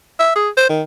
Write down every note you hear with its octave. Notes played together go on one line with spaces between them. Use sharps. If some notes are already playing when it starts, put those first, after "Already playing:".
E5
G#4
C5
D#3